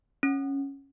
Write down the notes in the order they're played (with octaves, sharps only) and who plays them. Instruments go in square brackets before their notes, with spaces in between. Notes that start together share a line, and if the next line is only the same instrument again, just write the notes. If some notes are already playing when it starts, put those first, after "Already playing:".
[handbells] C#4